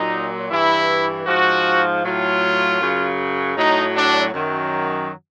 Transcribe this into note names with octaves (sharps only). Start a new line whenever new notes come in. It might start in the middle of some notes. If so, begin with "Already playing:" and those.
Already playing: A#2 F#3 D#4
G2 E3 E4
G#2 F3 F#4
A2 F#3 F4
F#2 C#3 F#3
A2 F#3 D#4
D4
F#2 D#3 F#3